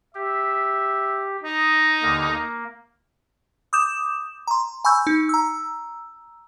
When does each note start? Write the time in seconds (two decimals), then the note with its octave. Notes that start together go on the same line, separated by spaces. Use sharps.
0.15 G4 E5
1.44 D#4 D#5
2.03 D#2 D3 A#3
2.32 A#3
3.73 D6 D#6 G6 E7
4.47 A#5 C6
4.85 G#5 B5 C#6 E6 G6
5.07 D#4
5.29 A#5 E6